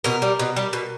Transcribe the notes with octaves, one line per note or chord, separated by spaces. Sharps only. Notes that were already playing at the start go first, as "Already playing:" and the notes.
B2 A#4
G3
B2
G3
B2